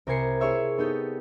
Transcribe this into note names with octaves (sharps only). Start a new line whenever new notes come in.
C2 A#4 C5 G#5 C7 C#7
E4 G#4 C#5 E5 C6
B3 D#4 G4 A4